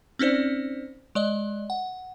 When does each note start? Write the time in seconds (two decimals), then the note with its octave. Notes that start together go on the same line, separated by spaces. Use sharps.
0.19 C4 C#4 D#4 C5 D5
1.15 G#3 D5 D#5
1.70 F#5